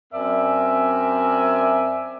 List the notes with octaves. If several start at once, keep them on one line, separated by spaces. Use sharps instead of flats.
F#2 C4 A#4 D5 E5 G#5